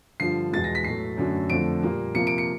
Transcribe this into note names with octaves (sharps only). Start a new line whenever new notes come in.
G2 D3 F3 C7
E2 B2 G#3 A6
A#6
B6
A2 F#3 A3 C7
F#2 D3 F#3 A3
F2 D3 F3 A3 D7
A#2 G3 A#3
C3 F3 A#3 C#7
D7
C#7